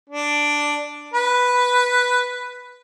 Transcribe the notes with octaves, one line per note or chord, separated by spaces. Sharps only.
D4
B4